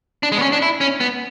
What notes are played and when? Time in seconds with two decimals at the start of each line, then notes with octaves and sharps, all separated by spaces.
0.23 D4
0.32 G#3
0.37 B3
0.42 C#4
0.52 D4
0.62 E4
0.81 C#4
1.00 B3